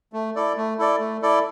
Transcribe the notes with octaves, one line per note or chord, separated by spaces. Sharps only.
A3
E4 A4 D5
A3
E4 A4 D5
A3
E4 A4 D5